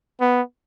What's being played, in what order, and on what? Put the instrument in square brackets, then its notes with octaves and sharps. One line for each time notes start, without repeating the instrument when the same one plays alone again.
[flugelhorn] B3